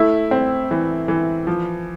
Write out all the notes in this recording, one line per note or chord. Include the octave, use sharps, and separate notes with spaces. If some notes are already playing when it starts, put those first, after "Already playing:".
Already playing: A3 E4
C4
E3
E3
F3